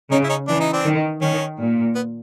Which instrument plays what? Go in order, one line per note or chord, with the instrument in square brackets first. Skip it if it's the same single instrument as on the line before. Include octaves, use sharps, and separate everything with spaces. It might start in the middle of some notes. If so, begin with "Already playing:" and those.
[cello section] C#3 [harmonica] C#4 D#4
[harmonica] E4
C#4 D#4
[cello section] E3 [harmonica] D4
[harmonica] D#4
C4 D4
[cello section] D#3
[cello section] D#3 [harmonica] C#4
[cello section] A#2
[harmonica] B3